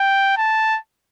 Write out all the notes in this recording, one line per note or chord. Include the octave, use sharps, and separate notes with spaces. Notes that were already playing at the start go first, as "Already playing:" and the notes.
Already playing: G5
A5